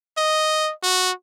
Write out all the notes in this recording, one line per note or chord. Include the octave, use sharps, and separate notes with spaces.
D#5
F#4